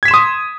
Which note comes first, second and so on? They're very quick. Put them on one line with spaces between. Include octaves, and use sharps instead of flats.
G#6 B6 E7 C6 D#6